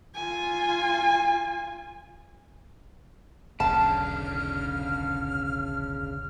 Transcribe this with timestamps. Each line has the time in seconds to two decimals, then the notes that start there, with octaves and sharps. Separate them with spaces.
0.15 F4 G#5
3.60 D1 B1 E2 C#3 D4 A5 F6